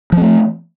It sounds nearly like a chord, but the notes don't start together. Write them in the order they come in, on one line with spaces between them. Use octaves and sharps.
F3 C4 A3